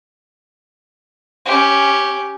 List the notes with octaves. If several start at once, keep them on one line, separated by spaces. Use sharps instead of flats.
C#4 G4